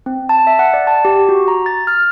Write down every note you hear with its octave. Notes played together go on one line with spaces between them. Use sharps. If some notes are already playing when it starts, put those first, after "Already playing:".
C4
A5
E5
F#5
D5
A5
G4
F#4
A#5
A6
F6